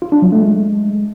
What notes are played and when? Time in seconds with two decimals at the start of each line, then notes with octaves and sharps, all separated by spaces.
0.02 F4
0.12 D4
0.22 F#3
0.32 A3
0.43 G#3